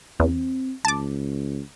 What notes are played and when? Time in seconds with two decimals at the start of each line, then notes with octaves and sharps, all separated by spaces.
0.20 E2 C4
0.85 C#2 A5 D6